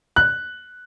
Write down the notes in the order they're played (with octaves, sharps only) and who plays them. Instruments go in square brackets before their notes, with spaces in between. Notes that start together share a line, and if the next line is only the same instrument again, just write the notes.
[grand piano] F#6